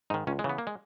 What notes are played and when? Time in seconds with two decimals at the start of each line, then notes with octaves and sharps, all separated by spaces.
0.10 G#2 D#3 D#4
0.27 C#2 C#4
0.39 G#3
0.44 C#3 E3
0.49 B3
0.58 A#3
0.67 G#3